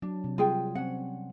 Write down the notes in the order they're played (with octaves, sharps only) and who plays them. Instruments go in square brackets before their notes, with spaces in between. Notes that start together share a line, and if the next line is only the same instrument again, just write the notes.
[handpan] F#3 [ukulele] D4
[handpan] C3
[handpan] G3 [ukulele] F4 G#4 G5
[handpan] C4 [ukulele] C#4 F#5